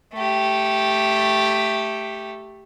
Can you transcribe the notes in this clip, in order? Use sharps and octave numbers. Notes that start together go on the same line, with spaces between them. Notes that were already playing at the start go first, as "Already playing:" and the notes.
A3 G4